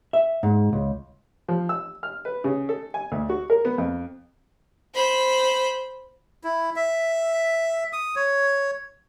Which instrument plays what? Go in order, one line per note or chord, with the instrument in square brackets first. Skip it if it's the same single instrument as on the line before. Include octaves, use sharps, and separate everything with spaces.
[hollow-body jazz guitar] E5
G#2
C#2
[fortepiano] F3
E6
F6
B4
C#3
A4
G#5
D2
F#4
A#4
B3
F2
[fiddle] C5 B5
[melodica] E4
E5
D#6
C#5